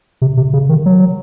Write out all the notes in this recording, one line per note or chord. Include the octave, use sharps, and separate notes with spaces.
C3
C3
C#3
D#3
F#3